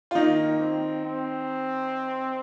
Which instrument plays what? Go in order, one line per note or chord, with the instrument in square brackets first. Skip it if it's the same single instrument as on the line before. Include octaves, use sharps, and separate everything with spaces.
[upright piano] F4
[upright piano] D#3 D#4 [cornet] A#3
[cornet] C4
C4